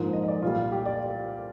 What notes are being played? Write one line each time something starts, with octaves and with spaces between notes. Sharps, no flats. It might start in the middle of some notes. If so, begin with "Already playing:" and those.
Already playing: A#1 G#2 F3 A#3
D#5
D#5
D5
C2 A#2 G3 F4
G4
D5